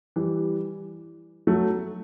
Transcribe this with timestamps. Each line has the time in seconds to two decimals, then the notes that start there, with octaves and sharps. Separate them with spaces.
0.16 E3 G3
1.47 F#3 A3